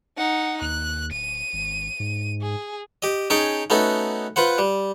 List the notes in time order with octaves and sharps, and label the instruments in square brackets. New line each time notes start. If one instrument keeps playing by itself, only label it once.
[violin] D#4 F#5
[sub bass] D#2 [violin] F#6
[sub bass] D1 [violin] D#7
[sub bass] G#1
G#2
[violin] G#4
[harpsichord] G4 D#5
C#4 D#4 G#4 C#5 G5 A5
A3 B3 C#4 D#4 F#4 A4
F4 B4 C5 F#5
G3